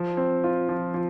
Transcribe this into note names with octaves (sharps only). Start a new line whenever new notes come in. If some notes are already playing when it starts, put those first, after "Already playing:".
Already playing: F3
C4
F4
F3
F3